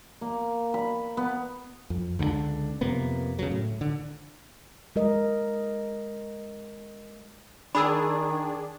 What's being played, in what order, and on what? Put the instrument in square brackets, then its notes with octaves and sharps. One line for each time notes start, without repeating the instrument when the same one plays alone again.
[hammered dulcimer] A#3
B5
B3
[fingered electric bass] F2
C#2 D3 G#3 D4
F2 C3 A#3 B3
C#3 F#3
A2
D3
[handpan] G#3 A#4 D#5
[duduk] D#3 [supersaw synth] D4 G#4 [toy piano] B5 E6